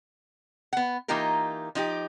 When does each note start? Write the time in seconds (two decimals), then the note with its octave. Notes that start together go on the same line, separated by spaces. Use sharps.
0.73 B3 F#5
1.08 E3 A#3 D#4 F4 G4 A#4
1.75 F3 D#4 F#4 G4